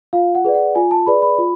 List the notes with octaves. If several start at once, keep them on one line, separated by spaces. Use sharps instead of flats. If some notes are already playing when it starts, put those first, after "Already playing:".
F4 F5
F#5
G#4 B4 D5
F#5
F4 G#5
A5
G#4 B4 D5 B5
B5
F4